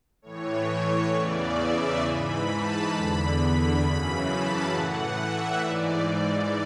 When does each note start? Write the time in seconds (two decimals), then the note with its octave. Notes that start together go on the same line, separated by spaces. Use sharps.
0.22 A2 E3 C#5
0.67 C#5
1.12 E2 C#3 E3 D5
1.57 E5
2.01 G#2 E3 B5
2.46 A5
2.90 E2 D3 B5
3.80 F#2 C#3 E3 B5
4.25 A5
4.69 A2 E3 F#5
5.14 E5
5.59 G#2 E3 D5
6.04 D5